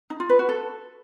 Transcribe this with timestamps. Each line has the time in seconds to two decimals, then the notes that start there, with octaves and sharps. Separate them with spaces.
0.10 D#4
0.20 F4
0.29 B4
0.39 F#4
0.49 A4